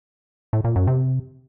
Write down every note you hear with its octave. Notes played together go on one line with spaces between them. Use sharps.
A2
A#2
F#2
C3